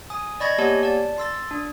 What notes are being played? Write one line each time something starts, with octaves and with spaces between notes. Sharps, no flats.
G#5 D#6
D5 D#5 B5 C#6 G#6 A#6
A#3 B3 G4 C#5 G#5 A5
D5 A5
C6 E6 A6
D4